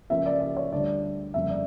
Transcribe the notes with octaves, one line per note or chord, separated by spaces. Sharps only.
C#2 C#3 F3 A#3 C#4 E5
D5
D5
C#5
D2 D3 G3 D4 D5
G1 F2 C#3 G3 A#3 E5
D5